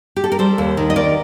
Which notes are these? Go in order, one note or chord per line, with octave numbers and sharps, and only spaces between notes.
G4
A4
A#4
G3 A4 C5
D#2
D#3
D#5
D#2 A#4 D5